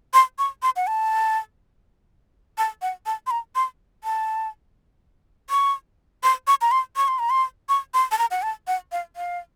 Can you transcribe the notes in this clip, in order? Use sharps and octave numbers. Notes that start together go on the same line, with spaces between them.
C6
C#6
C6
F#5
A5
A5
F#5
A5
C6
A#5
C6
A5
C#6
C6
C#6
A#5
C6
C#6
C6
A#5
C6
C#6
C6
A5
A#5
F#5
A5
F#5
F5
F5